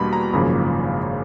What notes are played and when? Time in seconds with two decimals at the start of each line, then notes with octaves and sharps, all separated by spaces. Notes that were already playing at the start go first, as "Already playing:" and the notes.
Already playing: E2 B2 G3 A#3 D4 B5 C6
0.13 A#5
0.33 G#1 F#2 C#3 F3 A#3 B5